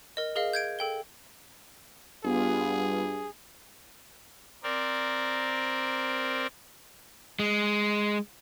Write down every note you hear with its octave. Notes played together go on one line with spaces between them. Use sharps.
A#4 D#5
G#4 A#4 D#5 F5
G6 G#6 D7
A4 G5 G7
G2 G3 B3 F4 G#4
C4 A#4 D5
G#3